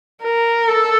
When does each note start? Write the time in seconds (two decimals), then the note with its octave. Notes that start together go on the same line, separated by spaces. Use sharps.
0.23 A#4
0.68 A4